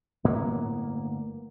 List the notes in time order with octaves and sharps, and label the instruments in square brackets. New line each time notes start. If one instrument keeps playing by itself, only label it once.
[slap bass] G1 A2 A#3 B3